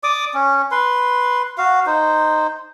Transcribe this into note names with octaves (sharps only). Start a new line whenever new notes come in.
D5 D6 D#6
C#4
B4 C6
F#4 F5
D#4 C5